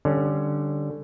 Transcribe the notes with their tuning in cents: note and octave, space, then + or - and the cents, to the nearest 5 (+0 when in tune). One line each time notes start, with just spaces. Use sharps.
D3 +10 G3 +0 C#4 +0